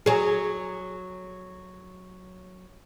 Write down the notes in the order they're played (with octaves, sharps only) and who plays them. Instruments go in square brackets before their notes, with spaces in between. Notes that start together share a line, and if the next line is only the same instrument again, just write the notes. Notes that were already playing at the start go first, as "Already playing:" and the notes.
[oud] F#3 G#4